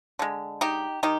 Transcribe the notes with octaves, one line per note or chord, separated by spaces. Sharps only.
D3 G#3
D#4 G4
D#3 D#4 G4